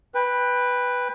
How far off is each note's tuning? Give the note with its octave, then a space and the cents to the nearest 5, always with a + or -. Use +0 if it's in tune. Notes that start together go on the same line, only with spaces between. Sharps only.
B4 +0 G5 +25